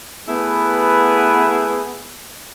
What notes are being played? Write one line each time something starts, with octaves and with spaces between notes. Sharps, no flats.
A3 B3 E4 G#4 B4